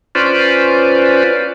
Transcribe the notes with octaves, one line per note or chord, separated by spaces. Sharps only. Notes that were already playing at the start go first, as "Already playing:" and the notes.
C#4 F4 B4 C5 D5